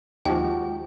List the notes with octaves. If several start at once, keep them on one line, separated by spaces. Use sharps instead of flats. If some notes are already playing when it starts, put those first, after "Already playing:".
D#2 F3 G#3 F#4 G4 G5